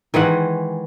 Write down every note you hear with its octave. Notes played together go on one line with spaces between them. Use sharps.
D#3 E3 G#3 F#5